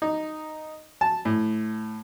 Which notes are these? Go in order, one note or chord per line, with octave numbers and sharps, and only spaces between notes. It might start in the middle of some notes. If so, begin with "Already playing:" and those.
D#4
A5
A2